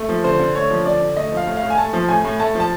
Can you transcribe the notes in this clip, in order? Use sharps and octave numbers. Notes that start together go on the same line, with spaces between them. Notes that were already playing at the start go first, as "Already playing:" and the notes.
Already playing: A3
F3
D3 C5
D3
A3 C#5
F3
D3 D5
D3
A3 D#5
F3
F5
A2
F5
A2
G#5
A3 A5
F3
A2 G#5
A2
A3 A5
F3 A5